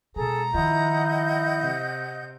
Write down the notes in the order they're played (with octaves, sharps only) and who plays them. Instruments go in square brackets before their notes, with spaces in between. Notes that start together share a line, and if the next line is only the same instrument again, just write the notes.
[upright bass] B2 G#3 [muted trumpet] G#4 [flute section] A4 [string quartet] A#5
[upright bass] D#3 F3 [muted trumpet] E4 [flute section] D#5 F#5 G6
[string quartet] C3